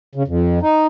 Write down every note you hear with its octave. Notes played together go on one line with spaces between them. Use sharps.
C#3
F2
D#4